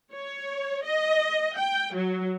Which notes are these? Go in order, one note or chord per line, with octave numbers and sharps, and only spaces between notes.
C#5
D#5
G5
F#3